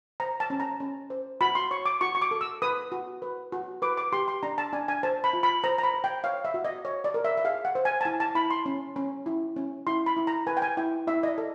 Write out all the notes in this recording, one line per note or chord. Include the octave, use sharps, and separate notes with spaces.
C5 A#5
A5
C#4
A#5
C#4
C5
F#4 B5
C6
C#5 C#6
D6
F#4 C#6
C#6
D6
A4
E6
B4 D#6
F#4
B4
F#4
B4 D6
D6
G4 C6
C6
D4 A#5
A5
D4 G#5
G#5
C5 A5
B5
F4
B5
C5 A#5
A#5
B5
C5
G5
C#5 F5
E5
F#4
D#5
C#5
D5
A#4
E5
E5
G#4 F5
F#5
C5
G#5
A5
E4 G#5
A5
E4 B5
C6
C#4
C#4
E4
C#4
E4 C6
B5
E4
A#5
B4 G#5
G5
G#5
E4 G5
E4 E5
D#5
D5
A4